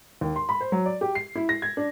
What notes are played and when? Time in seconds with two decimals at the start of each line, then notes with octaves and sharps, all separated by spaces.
0.21 D#2
0.36 C6
0.49 B5
0.61 C5
0.72 F#3
0.85 D5
1.01 G4
1.15 C7
1.35 E4
1.49 A#6
1.62 G#6
1.77 D4